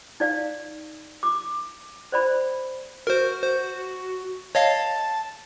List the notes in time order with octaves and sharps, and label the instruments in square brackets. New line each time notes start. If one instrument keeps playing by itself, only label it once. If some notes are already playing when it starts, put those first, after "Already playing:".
[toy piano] D#4 D5 F5
D6
C5 D5 B5
[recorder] F#4 [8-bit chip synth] A#4 C5
[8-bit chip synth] C5
[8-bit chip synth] C#5 D#5 F5 [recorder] A5